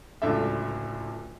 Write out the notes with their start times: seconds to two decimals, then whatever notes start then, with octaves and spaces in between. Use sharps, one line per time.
0.22 D1 C#2 D4 A4 E5